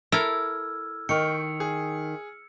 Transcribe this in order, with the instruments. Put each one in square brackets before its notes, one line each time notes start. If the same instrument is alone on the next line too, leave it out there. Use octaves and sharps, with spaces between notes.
[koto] E4 A4 A#4 [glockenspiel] E6 F6 G#6
[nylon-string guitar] D#3 [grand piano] G5 C#6 F6 [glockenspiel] C#7
[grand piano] G#4